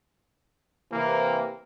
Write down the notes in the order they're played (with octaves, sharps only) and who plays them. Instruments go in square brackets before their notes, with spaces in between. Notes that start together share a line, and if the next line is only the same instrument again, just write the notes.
[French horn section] C3 E3 [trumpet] A#3